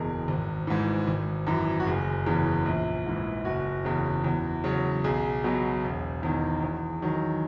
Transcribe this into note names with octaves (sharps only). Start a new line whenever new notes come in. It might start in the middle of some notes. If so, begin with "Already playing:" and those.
Already playing: F#1 E2 B2 G#4 A#4
G#1
G#2 E3
G#1
F#2 E3
F#4
F#1 G#4
E2 C#3 E3
A#1
G#2 E3
F#1 F#4
E2 C#3
E2
C#3 F#3
B1 G#4
B2 F#3
E1
E2 D#3
E2
D#3 F#3